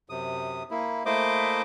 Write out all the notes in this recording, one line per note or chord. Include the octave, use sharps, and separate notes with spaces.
F#2 C3 D#6
A#3 E4
A3 A#3 E4 C5 D#5 D6